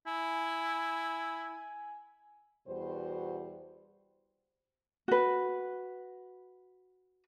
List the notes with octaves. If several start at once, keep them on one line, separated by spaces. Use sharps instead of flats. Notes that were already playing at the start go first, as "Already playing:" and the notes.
E4 G#5
E2 B2 G3 F#4 C5
F#4 B4